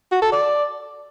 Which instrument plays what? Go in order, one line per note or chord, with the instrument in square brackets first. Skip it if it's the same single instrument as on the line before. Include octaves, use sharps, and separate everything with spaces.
[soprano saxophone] F#4
A4
D5